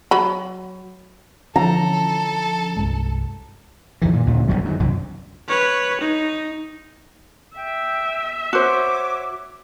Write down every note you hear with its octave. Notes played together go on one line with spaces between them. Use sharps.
F#3 B5
D3 E3 F3 C#4 A4 A#5
C2 G2 G#3
F2 D#3 E3
A#2
D#2 A#2 D3
F1 C#2 F#2 G3
F#2 D#3
C2 F#2
B4 C#5
D#4
E5 G5
F#4 C5 C#5 D6